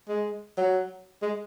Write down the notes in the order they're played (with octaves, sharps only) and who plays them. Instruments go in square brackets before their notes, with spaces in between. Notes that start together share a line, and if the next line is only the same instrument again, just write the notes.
[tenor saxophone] G#3
F#3
G#3